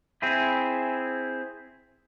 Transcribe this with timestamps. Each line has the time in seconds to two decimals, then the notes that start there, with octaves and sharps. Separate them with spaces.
0.22 C4 E4 G#4